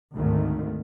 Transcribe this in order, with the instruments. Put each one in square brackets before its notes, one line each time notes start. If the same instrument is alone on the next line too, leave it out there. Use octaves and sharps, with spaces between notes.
[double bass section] G#1 D2 G#2 D#3 A3